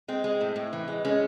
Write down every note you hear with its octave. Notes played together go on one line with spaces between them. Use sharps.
G#3 C4
G#3
A2
A2
E3
G#3
G#3 C#4